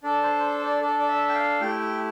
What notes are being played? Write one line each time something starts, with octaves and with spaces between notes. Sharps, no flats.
D4 A4 D5
C5
C5
D5
D4 A4 D5
D5
E5
G5
F5
A3 E4 G4 G5
G5